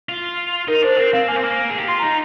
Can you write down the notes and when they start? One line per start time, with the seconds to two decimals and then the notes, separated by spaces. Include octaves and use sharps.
0.09 F4
0.68 D#4 A#4
0.83 D4 C5
0.98 C4 A#4
1.13 C4 F5
1.28 A#3 G#5
1.36 C4
1.43 A#3
1.70 G#4
1.78 G4
1.87 F4 C6
1.99 D#4 A#5